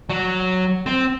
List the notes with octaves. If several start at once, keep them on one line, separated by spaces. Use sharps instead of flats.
F#3
C4